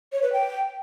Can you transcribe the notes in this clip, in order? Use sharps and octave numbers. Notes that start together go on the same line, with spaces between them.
C#5
B4
G5